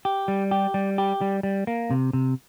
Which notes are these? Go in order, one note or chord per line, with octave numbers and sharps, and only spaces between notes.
G4
G3
G4
G3
G4
G3
G3
A#3
C3
C3